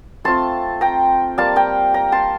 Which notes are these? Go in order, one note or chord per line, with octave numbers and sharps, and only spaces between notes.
A3 C4 F4 A5 C6
G5 A#5
G3 A#3 F4 F5 A5
G5 A#5
G5 A#5
A5 C6